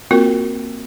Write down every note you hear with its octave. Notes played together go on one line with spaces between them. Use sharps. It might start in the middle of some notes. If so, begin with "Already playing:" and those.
A#3 C4 F4 F#4 A#4